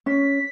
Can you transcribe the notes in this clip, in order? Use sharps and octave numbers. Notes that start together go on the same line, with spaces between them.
C#4 B6